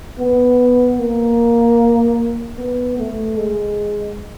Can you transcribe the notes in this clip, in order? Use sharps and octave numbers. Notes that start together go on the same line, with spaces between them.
B3
A#3
B3
A3
G#3